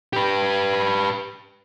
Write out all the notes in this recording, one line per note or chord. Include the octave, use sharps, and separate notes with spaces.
G4 B4